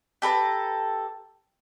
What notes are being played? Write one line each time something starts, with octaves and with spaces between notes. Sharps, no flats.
G4 A4 B4 A#5